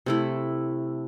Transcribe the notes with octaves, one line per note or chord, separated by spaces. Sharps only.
C3 A3 E4